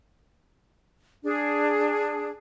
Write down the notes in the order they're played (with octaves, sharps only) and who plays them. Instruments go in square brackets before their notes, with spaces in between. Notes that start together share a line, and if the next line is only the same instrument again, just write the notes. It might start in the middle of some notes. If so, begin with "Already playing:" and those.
[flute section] D4 G#4